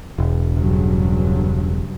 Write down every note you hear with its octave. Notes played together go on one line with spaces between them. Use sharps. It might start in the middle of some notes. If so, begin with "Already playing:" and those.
E1
G2 C#3 F#3